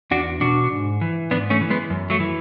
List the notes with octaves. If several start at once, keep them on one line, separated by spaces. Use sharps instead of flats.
E2 D4 F#4
B2 D4 F#4
G#2
E3
G#2 B3 D4
A3 C#4
E3
G#3 B3
F#2
F#3 A3
E3